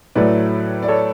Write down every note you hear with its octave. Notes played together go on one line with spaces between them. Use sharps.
A2 F#3 A3 B4 D5
D5
A4 C#5